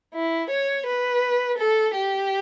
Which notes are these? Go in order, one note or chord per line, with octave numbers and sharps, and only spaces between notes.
E4
C#5
B4
A4
G4